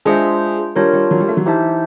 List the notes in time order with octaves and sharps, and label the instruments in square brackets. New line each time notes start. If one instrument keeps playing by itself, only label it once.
[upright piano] G#3 [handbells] D4 F4 G#4 C5 E5
[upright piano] G3 [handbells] D4 F4 A#4 C#5
[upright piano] G3
F#3
G3
A3
F#3
[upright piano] E3 [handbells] D#4 G4 C5 E5 A5